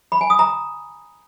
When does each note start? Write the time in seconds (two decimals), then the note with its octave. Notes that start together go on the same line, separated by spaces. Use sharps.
0.12 B5
0.21 G#5
0.30 D#6
0.39 A#5